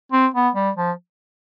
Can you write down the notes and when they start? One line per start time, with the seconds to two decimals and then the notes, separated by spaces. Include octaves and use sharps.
0.12 C4
0.34 B3
0.55 G3
0.76 F3